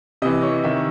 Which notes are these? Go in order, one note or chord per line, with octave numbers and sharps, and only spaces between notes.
C3 E3 D#5
C#5
C3 D#3 E5